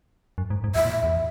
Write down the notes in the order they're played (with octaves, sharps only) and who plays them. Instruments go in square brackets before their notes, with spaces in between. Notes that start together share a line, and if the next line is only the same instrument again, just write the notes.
[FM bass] F#2
G#2
G#2
[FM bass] E2 [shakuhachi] E5
[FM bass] A#2
E2